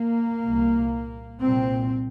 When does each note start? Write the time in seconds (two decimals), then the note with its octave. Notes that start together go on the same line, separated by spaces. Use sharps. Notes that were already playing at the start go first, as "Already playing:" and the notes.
Already playing: A#3
0.48 C2 A#2
1.42 C2 A#2 C4